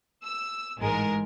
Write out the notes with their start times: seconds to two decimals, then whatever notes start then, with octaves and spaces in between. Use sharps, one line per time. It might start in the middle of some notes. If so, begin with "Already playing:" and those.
0.24 E6
0.78 A1 G#2 G#3 A#4